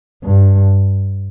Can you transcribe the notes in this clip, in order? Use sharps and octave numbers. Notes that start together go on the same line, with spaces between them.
G2